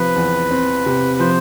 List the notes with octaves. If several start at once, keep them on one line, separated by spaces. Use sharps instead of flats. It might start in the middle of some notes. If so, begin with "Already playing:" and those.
Already playing: C3 F3 B4
E2
C4
C3
F3 C5